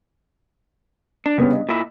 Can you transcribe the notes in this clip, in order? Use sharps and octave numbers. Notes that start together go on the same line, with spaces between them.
D4
G2 C#3 B3 C#4
D#5
A#2 E4